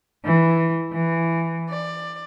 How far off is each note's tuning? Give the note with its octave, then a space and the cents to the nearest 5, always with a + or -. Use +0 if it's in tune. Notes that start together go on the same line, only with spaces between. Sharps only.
E3 +0
E3 +10
D5 +20